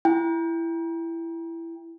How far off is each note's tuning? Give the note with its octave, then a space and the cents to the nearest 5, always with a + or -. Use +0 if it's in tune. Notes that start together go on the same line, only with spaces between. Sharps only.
E4 +15 G5 +25